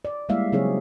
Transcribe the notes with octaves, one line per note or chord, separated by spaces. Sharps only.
D5
G3 G#3 A#3 E4 E5 F5
C#3 F#3 C4 D#4 G#4 C#5